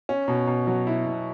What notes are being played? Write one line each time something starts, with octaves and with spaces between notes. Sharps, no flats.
C#4
B2
B2
F#3
E4
B2